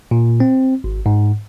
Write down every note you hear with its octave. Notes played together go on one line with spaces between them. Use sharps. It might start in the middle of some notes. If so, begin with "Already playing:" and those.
A#2
C4
G#1
G#2